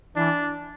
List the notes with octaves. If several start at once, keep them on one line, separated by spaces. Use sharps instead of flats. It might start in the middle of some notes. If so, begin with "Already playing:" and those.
E3 D4